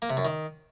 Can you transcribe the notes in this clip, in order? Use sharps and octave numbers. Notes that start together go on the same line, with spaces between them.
A#3
C3
F#2
D#3